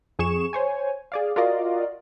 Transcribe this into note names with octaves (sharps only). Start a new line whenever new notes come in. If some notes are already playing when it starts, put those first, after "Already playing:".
F2 G#4 C#6 E7
C5 C#5 G#5
G#4 D5 F5
F4 F#4 A#4 D5 D#5 F5